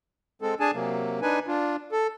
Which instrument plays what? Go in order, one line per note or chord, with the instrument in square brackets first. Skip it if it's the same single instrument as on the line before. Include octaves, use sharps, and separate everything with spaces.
[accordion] G#3 C4 A4
D4 G#4 G#5 A5
C3 F#3 A#3
D4 D#4 B4 G#5
D4 F4
A4